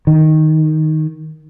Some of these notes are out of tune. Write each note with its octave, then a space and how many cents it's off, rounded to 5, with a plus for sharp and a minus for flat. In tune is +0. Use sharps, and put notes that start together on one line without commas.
D#3 +5